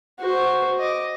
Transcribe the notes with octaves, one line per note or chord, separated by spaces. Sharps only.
F#4 C5
D#5 D6